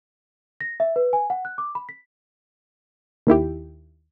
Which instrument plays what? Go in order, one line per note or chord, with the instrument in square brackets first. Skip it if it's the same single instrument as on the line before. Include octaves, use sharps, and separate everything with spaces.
[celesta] A#6
E5
B4
G#5
F#5
F#6
D6
B5
B6
[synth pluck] D#2 D#3 E4 G4